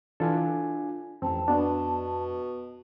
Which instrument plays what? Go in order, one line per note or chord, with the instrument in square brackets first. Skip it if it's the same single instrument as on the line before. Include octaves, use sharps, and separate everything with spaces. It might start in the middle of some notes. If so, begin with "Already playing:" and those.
[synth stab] E3 A4 [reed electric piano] D4 F4 G#5
[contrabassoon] A1 [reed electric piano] F2 [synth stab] C4 [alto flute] A5
[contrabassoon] B2 [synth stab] B3 D4